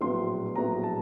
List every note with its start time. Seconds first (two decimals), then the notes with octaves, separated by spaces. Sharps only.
0.01 A#1 A2 F#3 B3 C6
0.55 A#1 A2 F#3 B3 A#5
0.83 A5